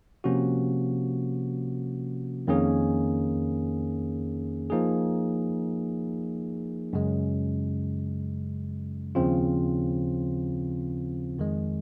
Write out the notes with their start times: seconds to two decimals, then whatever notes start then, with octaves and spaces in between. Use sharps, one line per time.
0.24 C3 F3 A#3 C#4 F#4
2.47 F2 D#3 A#3 C#4 G#4
4.70 F3 A#3 D#4 G#4
6.93 F#2 C#3 G#3
9.15 D#2 C#3 F3 C4 F4
11.38 F2 D#3 G#3